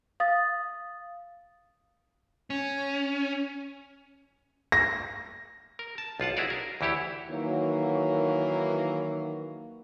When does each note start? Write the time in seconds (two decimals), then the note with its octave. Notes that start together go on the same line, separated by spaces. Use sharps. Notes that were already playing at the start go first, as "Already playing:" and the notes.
0.20 F5 D#6 A6
2.50 C#4
4.72 A#6
5.79 A#4
5.98 A5
6.20 B1 F4 F#5 A5
6.37 E4 F#4 G#4 C#5 D5
6.50 A#4
6.81 D2 E3 E4 G4 C#5
7.29 D#3 E3 F#3 A#3